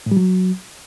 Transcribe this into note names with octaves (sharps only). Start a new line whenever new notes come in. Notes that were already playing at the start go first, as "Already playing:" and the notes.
A2
G3
F#3